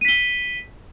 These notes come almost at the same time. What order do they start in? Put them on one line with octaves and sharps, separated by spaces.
D#7 B6 G7